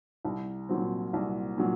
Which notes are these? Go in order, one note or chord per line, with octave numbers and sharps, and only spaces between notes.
C2
A#2 F#3 C4
C2
A#2 F#3